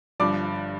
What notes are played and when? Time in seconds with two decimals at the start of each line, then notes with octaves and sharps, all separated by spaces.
0.20 G1 G2 F3 D5 D6